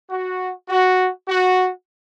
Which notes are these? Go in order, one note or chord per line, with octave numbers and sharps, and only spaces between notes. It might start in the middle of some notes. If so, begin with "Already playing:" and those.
F#4
F#4
F#4